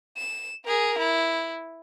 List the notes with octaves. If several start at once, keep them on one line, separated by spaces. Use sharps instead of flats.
E7
G#4 A#4
E4